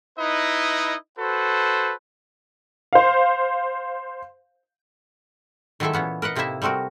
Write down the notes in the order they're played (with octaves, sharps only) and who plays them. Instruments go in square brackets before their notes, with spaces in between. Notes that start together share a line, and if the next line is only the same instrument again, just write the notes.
[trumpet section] D#4 E4 B4 D#5
F#4 A4 B4 C5
[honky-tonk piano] C5 F5
[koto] D#3 F#3 G#3 E4 A4 E5
A#2 E3 B3 C#4
A#4 B4 D#5 F#5
A2 C3 A#3 D#4 E4 E5
G3 A3 C4 F#4 A#4